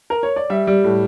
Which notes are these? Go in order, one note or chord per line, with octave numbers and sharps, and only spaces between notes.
A#4
C#5
D5
G3 E5
G3
A2